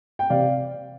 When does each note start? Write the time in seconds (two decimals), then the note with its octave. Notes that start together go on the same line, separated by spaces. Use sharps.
0.19 G5
0.30 C3 D5 F5